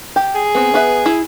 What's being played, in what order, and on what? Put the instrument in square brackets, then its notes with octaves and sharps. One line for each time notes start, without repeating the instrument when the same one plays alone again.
[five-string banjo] G4
[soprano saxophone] G#4
[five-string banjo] B3 C4
B3 B4 E5
E4